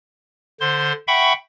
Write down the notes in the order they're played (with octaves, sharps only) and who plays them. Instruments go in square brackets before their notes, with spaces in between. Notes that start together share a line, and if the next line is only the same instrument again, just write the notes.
[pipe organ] D3 C5 C6
E5 F#5 G5 B5 C#6